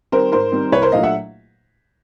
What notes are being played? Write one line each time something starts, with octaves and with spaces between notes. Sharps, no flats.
D#3 G3 C4 A#4 C5
G#2 A#4 C5
D#3 G3 C4
C2 B4 C#5
A#4 C5
A#2 F#3 A3 D4 D#5 F5
E5 F#5